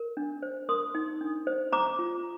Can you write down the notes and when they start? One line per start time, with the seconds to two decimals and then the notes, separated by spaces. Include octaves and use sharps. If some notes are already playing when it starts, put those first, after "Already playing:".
Already playing: A#4
0.17 D4
0.42 C5
0.69 A#4 C6 D#6
0.95 D#4
1.21 D4
1.47 C5
1.72 C5 A#5 D6
1.99 F4